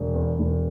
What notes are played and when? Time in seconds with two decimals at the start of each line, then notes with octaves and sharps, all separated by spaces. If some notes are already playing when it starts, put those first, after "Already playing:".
Already playing: E1
0.14 E2
0.39 E1